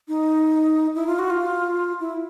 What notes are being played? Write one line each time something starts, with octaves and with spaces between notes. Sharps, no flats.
D#4
E4
F4
F#4
F4
E4